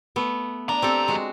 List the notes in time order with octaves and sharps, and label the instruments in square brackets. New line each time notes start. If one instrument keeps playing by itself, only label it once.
[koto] A3 B3
[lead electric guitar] F2 A#5 [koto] D4
[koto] C4 G4 A4
G#3 F#4